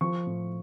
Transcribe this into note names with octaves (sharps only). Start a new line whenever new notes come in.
F3 C#6
A2